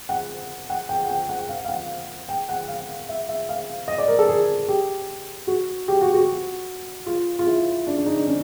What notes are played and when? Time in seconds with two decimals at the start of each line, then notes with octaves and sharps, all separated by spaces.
0.09 F#5
0.70 F#5
0.89 G5
1.05 F#5
1.10 G5
1.29 F#5
1.49 F5
1.65 F5
1.69 F#5
2.29 G5
2.49 F#5
2.68 F5
3.09 E5
3.29 E5
3.49 F5
3.88 D#5
3.98 D5
4.08 A#4
4.19 A4
4.29 G#4
4.69 G4
5.47 F#4
5.88 G4
6.01 F#4
6.14 F#4
7.06 F4
7.39 F4
7.47 E4
7.87 D4
7.97 D4
8.06 D#4
8.17 D4
8.27 C#4